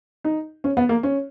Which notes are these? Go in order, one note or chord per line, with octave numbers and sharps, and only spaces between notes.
D#4
C#4
B3
A#3
C#4